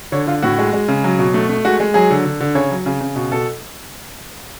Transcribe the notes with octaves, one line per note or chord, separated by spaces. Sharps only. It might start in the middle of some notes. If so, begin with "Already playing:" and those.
D3 C#5
D3 F4
A2 F#4
G#3
G#3
C#3
F#3
B2
A3
A3
G#3 F#4
G#3
F#3 G#4
D3
D3
D3
C#3 C#5
F#3
C#3
C#3
B2
B2 A4